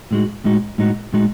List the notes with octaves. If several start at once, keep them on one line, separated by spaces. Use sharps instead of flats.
A2 G#3 D#4 F#4
A2 G#3 D#4 F#4
A2 G#3 D#4 F#4
A2 G#3 D#4 F#4